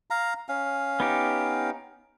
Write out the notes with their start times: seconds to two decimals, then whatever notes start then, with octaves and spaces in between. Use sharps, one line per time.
0.10 F5 A#5
0.49 C#4 F5
1.00 B3 D#4 G4